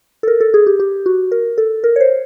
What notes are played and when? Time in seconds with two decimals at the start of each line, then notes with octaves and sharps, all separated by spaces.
0.23 A4
0.28 A#4
0.41 A4
0.54 G#4
0.67 G4
0.80 G4
1.06 F#4
1.32 A#4
1.58 A4
1.84 A#4
1.96 C#5
2.01 C5